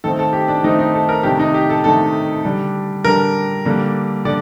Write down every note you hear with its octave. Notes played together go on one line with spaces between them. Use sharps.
D#3 A3 C4 A4
A4
G4
D4
D#3 A3 C4 D#4
D#4
A4
A#4
C3 D#3 A3 D4 G4
D#4
G4
A4
C3 D#3 A3 D4 A4
D3 G3 D4
D3 G3 D4 A#4
D3 G3 A#3 D4
D3 D5